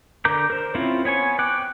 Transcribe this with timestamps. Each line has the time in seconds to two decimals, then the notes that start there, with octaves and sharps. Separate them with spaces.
0.25 D3 A#4 A#5 D6 G6
0.50 A#4 C5
0.75 C4 C#4 E4 F4 C5
1.05 B3 C#5 G#5 C#6
1.39 G5 D6 F#6